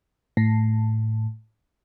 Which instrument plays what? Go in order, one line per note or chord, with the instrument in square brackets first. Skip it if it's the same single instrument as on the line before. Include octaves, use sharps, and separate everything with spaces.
[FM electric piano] A2